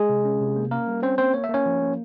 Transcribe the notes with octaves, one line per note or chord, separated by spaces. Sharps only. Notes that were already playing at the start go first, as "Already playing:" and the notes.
Already playing: G#3 G#4
C3
C#4
C3
A#3
A#3 C#4 A#4
G3
C4 C#4 C5
A#3 C4 C5
A#3 C#5
E5
A#3 C#4 C#5
F3
A#3